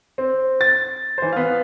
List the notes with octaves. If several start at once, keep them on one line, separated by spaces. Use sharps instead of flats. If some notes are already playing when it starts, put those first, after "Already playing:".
C4
A6
E3 C5
B3 F5